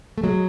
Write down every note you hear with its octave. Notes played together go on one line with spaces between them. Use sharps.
A3
F#3 G#3